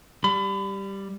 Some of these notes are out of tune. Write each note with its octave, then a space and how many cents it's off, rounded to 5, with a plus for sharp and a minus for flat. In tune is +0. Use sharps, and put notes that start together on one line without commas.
G3 +0 B5 +30